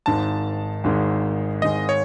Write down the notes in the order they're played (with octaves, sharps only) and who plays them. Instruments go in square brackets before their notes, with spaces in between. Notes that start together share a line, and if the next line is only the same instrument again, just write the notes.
[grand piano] G#1 G#2 D#3 G#3 [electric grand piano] A5
[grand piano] G#1 G#2 D#3 G#3
[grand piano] G#1 G#2 D#3 G#3 [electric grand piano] D#5
[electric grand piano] C#5